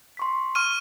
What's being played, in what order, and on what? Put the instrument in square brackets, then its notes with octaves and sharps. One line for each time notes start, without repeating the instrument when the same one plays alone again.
[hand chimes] C6 C#6 B6
[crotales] C#6 F6 D#7